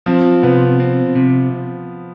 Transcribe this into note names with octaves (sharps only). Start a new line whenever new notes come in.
F3 C4
C3 B3
C4
C3